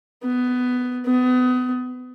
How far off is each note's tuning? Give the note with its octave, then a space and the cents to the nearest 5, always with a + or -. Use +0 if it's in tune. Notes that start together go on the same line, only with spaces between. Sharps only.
B3 +15
B3 +30